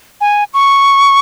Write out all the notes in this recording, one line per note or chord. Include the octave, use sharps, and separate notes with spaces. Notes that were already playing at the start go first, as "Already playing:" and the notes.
G#5
C#6